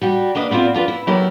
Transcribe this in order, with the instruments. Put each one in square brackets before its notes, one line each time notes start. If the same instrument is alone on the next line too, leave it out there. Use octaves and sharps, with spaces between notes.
[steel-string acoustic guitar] G3 F#4 G4
A#3 D4 B4 D#5
B3 C4 E4 F4 D5
D4 F4 A4 B4
E4
F#3 A3 B3 E4 G4 A#4